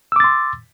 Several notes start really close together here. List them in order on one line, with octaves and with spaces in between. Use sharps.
E6 D6 A6 C6